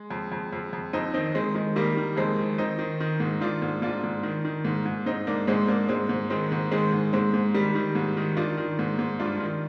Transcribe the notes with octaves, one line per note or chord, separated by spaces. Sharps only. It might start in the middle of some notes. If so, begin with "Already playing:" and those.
Already playing: G#3
F2
F2
F2
F2
F2 C4 D#4
D#3 C4 D#4
D#3 G#3 C4
D#3 G#3
D#3 G3 A#3
D#3
F2 G#3 C4
D#3
D#3 C4 D#4
D#3
D#3
G#2
D#3 D4 F4
G#2
G#2 D4 F4
G#2
D#3
D#3
G#2
G#2
G#2 C4 D#4
G#2 A#3 D4
G#2 G#3 C4
G#2 A#3 D4
G#2 G#3 C4
G#2
D#3 G#3 C4
G#2
D#3 G#3 C4
G#2
G#2 G#3 C4
G#2
D#3 G3
D#3
G#2
D#3
D#3 D4 F4
D#3
G#2
G#2
G2 D4 F4
D#3